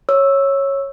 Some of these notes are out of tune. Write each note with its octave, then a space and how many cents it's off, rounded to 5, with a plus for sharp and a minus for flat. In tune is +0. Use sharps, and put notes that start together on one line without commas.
C#5 -10 E6 +0